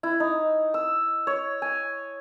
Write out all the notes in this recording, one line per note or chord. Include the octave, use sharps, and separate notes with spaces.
E4
D#4
E6
C#5
G#5